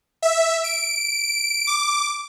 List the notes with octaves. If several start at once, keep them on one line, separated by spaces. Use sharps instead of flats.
E5
D7
D6